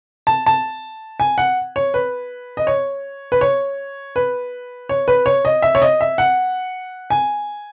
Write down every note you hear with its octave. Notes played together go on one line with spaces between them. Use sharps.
A5
A5
G#5
F#5
C#5
B4
D#5
C#5
B4
C#5
B4
C#5
B4
C#5
D#5
E5
C#5
D#5
E5
F#5
G#5